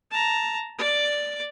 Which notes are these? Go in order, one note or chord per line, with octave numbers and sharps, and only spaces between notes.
A5 A#5
D5 D6